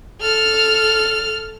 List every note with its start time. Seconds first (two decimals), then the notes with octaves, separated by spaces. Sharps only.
0.21 A4 F6